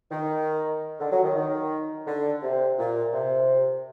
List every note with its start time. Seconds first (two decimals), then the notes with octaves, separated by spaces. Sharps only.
0.11 D#3
1.00 D3
1.12 F#3
1.24 D#3
1.36 D#3
2.07 D3
2.42 C3
2.78 A#2
3.13 C3